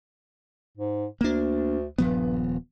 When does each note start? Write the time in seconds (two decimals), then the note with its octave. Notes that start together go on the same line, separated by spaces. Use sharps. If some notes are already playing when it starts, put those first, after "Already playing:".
0.77 G#2
1.21 D2 A#3 D4
1.98 D#1 G2 F3 B3